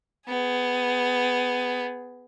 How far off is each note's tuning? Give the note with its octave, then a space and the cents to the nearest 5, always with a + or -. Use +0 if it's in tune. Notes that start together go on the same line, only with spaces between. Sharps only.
B3 +15 G#4 +0